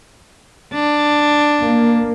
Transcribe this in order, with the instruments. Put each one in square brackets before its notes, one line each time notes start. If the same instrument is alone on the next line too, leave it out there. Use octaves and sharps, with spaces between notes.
[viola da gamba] D4
[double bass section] A#3